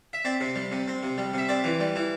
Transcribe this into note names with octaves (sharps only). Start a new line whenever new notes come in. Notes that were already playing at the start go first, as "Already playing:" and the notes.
E5
C4 D5
C3
G3
C3
C4
C3
G3
C3 E5
C4 D5
E3
G3
E3